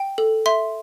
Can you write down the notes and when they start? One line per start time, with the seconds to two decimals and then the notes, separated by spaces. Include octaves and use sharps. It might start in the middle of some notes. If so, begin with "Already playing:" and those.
Already playing: G5
0.18 A4
0.46 E5 C6